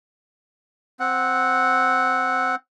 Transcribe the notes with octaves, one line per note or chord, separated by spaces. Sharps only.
C4 F#5